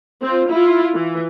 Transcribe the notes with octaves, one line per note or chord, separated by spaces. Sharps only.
C4 F4
E4 F4
E3